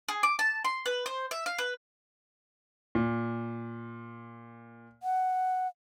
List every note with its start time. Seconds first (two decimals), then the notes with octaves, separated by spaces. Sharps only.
0.08 G#4
0.23 D6
0.39 A5
0.64 C6
0.86 B4
1.06 C5
1.31 E5
1.46 F5
1.58 B4
2.95 A#2
5.03 F#5